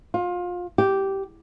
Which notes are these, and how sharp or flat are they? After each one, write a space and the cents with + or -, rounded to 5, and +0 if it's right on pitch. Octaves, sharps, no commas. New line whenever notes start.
F4 +25
G4 -10